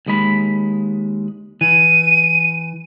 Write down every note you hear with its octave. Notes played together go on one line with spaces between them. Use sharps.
D#2 G#3 B5
E3 D#7